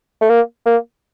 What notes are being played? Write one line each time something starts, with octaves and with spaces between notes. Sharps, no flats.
A3
A#3
A#3